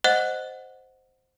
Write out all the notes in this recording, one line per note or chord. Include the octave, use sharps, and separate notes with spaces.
C5 D#5 F#5 F#6